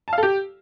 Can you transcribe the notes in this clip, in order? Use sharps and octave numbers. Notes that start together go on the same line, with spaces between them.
A5
F5
A4
G4